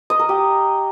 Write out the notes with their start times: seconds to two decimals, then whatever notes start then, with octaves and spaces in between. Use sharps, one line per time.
0.10 D#5
0.19 A#4
0.29 G4